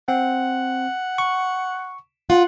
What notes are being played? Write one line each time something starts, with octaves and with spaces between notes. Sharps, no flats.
C4 F#5
C#6
F4 F#5